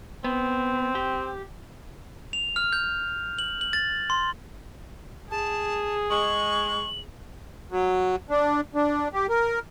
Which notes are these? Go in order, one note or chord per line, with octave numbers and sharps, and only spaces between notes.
B3 C4
G4
F7
F6
G6
F#7
F#7
A6
C6
G#4 A5
G#3 C#6 F#7
F#3
D4
D4
G4
A#4